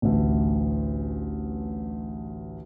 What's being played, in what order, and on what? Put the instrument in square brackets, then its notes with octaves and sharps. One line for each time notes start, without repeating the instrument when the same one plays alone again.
[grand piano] A1 D2